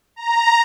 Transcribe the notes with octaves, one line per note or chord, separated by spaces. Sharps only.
A#5